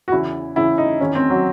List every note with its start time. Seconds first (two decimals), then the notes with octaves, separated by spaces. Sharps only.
0.08 F#4
0.12 E2 C#3 E3 E4
0.56 E2 C#3 E3 E4
0.78 D#4
1.01 E2 D#3 C#4
1.15 C4
1.30 F#3